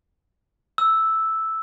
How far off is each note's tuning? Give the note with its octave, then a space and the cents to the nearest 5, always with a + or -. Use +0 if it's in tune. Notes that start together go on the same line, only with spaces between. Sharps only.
E6 -5